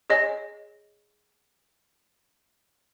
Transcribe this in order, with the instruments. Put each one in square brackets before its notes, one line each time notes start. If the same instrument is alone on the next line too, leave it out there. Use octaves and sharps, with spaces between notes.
[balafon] G#4 C#5 D#5 G#5